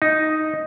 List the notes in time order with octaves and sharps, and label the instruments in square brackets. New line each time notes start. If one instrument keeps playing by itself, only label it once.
[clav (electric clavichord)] D#4